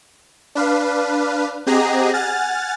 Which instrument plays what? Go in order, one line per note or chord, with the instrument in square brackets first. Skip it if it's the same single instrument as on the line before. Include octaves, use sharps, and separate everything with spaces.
[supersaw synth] D4 B4 F5
C4 G4 G#4 D#5 F#5 A#5
F#5 G#5 F6 A6